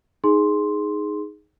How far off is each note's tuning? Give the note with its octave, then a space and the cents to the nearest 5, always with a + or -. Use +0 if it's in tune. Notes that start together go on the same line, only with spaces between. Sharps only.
D#4 +0 G#4 +0 C6 +0